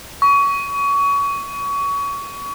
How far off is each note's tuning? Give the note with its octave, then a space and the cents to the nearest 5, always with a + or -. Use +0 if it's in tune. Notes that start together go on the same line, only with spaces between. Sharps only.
C#6 +25